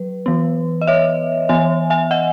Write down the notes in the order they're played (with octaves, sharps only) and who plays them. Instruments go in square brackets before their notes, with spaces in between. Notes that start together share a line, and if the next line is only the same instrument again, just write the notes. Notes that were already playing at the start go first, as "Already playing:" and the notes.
Already playing: [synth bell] F#3 B4
E3 B3
D#5
C#5 E5
E3 B3 E5 G#5
E5 G#5
D#5 F#5